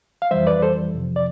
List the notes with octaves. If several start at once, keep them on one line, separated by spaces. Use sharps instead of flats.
F5
F2 E3 G3 C5 E5
B4 D5
A4 C5
F2 C3 F3
D5